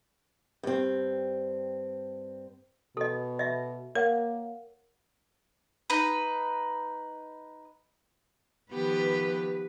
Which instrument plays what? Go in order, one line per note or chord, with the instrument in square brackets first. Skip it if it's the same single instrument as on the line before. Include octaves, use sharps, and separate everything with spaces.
[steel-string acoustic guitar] G2 C4
[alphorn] B2 [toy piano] A4 D#5
[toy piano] D#5 E5
[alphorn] A#3 [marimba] A#4 [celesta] C#5 F5 F#5
[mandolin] D#4 B4
[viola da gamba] D#3 B3 G4 [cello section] F3 B4